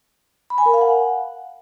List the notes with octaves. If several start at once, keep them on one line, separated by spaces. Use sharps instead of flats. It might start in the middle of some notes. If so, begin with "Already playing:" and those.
B5
G#5
A#4
F5
F#5